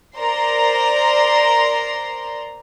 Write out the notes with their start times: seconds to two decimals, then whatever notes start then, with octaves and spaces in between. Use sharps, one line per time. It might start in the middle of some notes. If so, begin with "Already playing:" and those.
0.17 A#4 C5 D5 A#5 C6